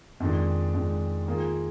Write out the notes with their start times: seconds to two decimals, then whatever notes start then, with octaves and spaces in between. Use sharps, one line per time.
0.20 F2 D#3 G#3 D4
0.74 F2 D#3 G#3 D4
1.26 D#3 A#3 F4 G#4